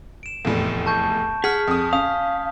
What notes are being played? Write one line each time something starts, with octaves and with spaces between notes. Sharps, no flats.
D7 E7
F1 E2 A2
A5 C#6 G6
G#4 F#5 F6 B6
F2 D#6
C#4 F5 D#6